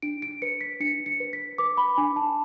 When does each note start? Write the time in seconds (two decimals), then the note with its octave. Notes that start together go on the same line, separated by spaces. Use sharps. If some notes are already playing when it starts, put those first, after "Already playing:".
0.02 D4 D7
0.22 D7
0.42 B4 C#7
0.61 B6
0.80 D4 C#7
1.06 C#7
1.20 B4
1.33 B6
1.58 B4 D6
1.77 B5
1.97 D4 G#5
2.16 A5